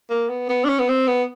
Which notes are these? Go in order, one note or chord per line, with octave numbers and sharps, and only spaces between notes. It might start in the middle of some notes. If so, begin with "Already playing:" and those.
A#3
B3
B3
D4
C#4
B3
C4
B3